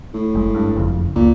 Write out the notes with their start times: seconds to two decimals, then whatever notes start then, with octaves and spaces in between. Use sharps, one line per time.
0.14 A2
0.35 F#1 G#3
0.55 G2
0.76 F#1 F2 C#3
1.16 C#2 A#2